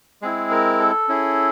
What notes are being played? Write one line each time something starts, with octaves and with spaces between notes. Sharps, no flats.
G#3 C4 E4 G#4
A#4
A4
C#4 E4 G#4